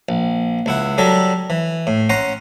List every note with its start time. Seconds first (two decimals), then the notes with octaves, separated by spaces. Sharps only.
0.09 A#1
0.66 C#2 E4 F#5
0.98 F#3 G3 A4 A#4
1.50 E3
1.87 A2
2.09 C#4 F#5 A#5 C6